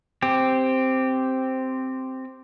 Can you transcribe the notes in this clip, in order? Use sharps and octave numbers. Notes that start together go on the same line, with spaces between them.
C4 G4